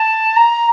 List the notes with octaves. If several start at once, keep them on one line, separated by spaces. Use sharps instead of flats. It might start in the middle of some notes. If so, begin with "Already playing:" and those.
Already playing: A5
A#5